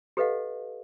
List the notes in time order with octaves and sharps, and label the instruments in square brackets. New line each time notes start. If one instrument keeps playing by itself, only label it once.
[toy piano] G4 A4 B4 D#5 F5 F#5